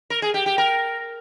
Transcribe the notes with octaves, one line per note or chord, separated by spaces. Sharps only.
A#4
G#4
G4
G4
A#4